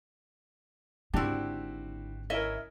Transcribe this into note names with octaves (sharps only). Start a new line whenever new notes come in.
G#1 D3 C4 D4 E4 F#4 G4
C#4 E4 A#4 D#5 E5